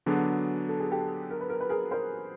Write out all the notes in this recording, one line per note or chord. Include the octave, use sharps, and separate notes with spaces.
D3 F#3 B3 D4 F#4 G#4
A4
G#4
G4 A4
A#4
B4
A#4
B4
G#4 A#4
A#4 C5